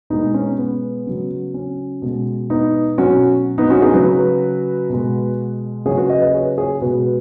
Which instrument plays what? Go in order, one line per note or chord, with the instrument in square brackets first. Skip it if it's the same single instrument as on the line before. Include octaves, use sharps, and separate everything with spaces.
[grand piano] B2 G#3 B3 D#4
C#4
B3
C#3 F#3
C#4
B2 G#3
B3 D#4
B2 F#3 C#4 F#4
B3 D#4
C#4 F#4
D#4 G#4
C#3 F#3 F#4 B4
B2 G#3
C#3 F#3 G#4 C#5
F#4 B4
B4 D#5
B4 D#5
G#4 C#5
G#4 C#5
B2 G#3 F#4 B4